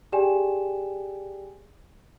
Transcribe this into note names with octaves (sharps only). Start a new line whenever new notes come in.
G4 G#4 D5 G5 G#5 E7